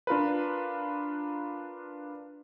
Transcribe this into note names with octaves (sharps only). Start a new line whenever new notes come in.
D4 F4 A#4 B4